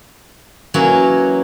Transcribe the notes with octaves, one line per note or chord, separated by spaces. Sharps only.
E3 F#3 A#3 C#4